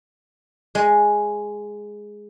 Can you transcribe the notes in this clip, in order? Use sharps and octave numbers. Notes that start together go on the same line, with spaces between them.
G#3